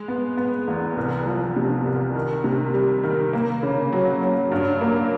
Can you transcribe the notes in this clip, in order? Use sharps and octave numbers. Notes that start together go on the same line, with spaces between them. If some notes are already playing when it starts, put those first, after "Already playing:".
Already playing: G#3
B3
B3
E2
C2
F3
C3
C2
D#3
C3
G3
D#3
A#3
C#3
F#3
F#3
G2
A#3